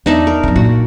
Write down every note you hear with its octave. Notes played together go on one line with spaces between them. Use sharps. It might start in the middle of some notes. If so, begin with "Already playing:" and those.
E2 D4 D#4 E5
A#4
F#2 C3
A#2 F#4